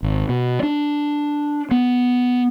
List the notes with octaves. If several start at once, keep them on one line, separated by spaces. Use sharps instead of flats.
G#1
B2
D4
B3